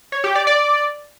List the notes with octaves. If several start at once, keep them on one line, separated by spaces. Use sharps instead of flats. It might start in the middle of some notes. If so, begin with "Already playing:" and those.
C#5
G4
D5
D5